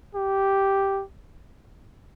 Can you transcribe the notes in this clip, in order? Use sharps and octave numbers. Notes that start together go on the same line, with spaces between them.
G4